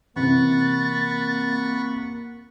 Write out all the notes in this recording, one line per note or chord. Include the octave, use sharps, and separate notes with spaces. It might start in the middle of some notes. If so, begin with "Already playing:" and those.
C3 E3 A#3 F#5 B5 C#6 A6